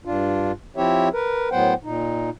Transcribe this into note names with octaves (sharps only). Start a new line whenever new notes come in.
G2 D4 F4
F3 C4 E4 G4 C#5 E5
A#4 B4
A2 F#3 B3 C5 F#5 G5
A#2 D#4